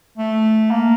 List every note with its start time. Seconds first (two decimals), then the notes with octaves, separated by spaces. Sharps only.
0.18 A3
0.71 A#3